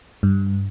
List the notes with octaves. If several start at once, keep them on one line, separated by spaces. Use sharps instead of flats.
G2